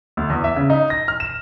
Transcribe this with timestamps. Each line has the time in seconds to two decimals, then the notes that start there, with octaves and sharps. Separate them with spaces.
0.17 D2
0.30 E2
0.44 E5
0.56 C#3
0.70 D#4
0.90 A#6
1.08 F6
1.20 E7